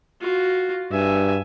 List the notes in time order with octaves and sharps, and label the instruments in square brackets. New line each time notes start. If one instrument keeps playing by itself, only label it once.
[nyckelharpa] F4 F#4
[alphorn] G2 [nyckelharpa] E5 G#5